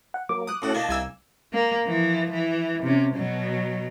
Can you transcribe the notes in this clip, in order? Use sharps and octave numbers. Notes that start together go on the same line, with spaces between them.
F#5
F#3 A#3 D6
D#6 F#6
A2 C#4 F#4 A4 F#5
A#3 D4 D#4 A5
C2 G#5 E6
A#3
E3 F3
E3
C3 C#4
B2 F#3